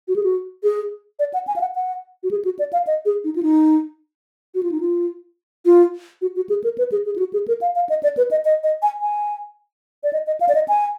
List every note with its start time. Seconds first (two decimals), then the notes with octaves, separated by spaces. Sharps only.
0.08 F#4
0.16 G#4
0.23 F#4
0.63 G#4
1.19 D5
1.34 F#5
1.47 G#5
1.56 F5
1.61 F#5
1.75 F#5
2.23 F#4
2.31 G#4
2.45 F#4
2.59 D5
2.73 F5
2.87 D#5
3.05 G#4
3.24 D#4
3.36 F4
3.43 D#4
4.55 F#4
4.63 F4
4.71 D#4
4.80 F4
5.66 F4
6.22 F#4
6.36 F#4
6.49 G#4
6.64 A#4
6.78 B4
6.92 G#4
7.06 G#4
7.16 F4
7.19 F#4
7.33 G#4
7.48 A#4
7.61 F5
7.75 F5
7.89 D#5
8.03 D5
8.17 B4
8.31 D#5
8.45 D#5
8.64 D#5
8.82 G#5
9.01 G#5
10.04 D5
10.13 D#5
10.27 D#5
10.41 F5
10.49 D5
10.55 D#5
10.68 G#5